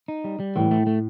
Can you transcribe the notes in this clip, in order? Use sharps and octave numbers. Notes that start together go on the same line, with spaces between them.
D#4
G3
G3
A2 E3
A3
A3